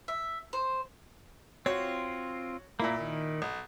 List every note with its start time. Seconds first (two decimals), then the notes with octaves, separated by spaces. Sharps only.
0.08 E5
0.53 C5
1.66 C4 F4 F#4 C#5
2.80 A#2 A#3 E4 B5
3.00 D#3
3.42 B1